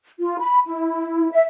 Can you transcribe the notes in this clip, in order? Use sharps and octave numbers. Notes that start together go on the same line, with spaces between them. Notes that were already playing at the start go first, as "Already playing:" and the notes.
F4
B5
E4
E5